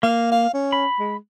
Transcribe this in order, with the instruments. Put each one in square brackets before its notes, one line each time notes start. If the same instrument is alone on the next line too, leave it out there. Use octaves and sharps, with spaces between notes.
[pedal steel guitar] A#3 [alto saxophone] F5
[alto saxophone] F5
C#4
[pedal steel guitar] B5
[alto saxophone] G#3